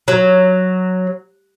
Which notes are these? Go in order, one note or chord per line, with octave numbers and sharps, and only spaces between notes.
F#3